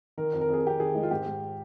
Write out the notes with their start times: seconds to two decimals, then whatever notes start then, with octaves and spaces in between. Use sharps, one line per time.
0.18 D#3 A#4
0.33 F2
0.41 A#4
0.49 F2 G#4
0.64 F2 G4
0.80 D#3 G#4
0.95 G#3 D#4
1.03 F4
1.11 G#2 G4
1.26 G#2